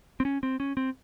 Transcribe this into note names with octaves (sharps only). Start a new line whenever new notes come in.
C4
C#4
C4
C#4
C4